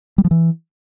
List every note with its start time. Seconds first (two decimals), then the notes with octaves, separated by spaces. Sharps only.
0.18 G3
0.25 F3
0.31 E3